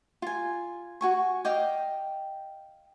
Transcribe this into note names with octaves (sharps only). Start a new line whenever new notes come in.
F4 G#5
F#4 G#5 C#6
D#5 F5 G5 D6